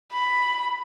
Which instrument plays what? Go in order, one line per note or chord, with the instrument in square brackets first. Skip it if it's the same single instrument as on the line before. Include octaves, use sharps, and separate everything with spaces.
[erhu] B5